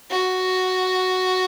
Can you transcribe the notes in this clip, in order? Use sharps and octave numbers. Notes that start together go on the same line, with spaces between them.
F#4